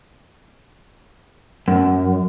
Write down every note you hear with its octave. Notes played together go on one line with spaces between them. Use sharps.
F#2